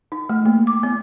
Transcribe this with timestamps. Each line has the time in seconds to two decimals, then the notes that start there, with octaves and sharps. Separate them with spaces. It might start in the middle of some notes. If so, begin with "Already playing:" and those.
0.12 D#4
0.29 A3
0.46 A#3
0.67 D6
0.83 B3